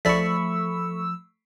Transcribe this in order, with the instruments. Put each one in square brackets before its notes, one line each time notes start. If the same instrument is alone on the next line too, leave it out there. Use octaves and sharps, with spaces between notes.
[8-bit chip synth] A#1 D5 B6 [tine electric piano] F3 [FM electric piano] A3 B5 C#6 [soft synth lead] E6